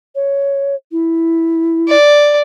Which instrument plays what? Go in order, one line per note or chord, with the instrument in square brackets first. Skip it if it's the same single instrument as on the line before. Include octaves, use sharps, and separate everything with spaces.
[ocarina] C#5
E4
[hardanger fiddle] D5